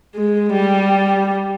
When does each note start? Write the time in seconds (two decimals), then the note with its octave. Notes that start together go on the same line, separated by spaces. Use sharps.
0.15 G#3
0.53 G3